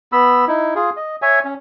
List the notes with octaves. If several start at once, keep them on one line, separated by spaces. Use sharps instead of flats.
B3 B5 E6
D#4 E4
F4 G#4
D#5
C#5 E5 G#5
C#4